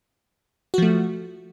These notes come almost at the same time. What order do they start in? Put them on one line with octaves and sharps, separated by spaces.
F#4 F3 A3